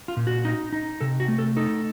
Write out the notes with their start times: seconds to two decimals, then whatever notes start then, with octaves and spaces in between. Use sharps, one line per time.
0.08 F4
0.17 A#2
0.27 F#4
0.45 D#4
0.73 D#4
1.01 C3 A4
1.20 F#4
1.28 A3
1.38 A4
1.56 D#4 A4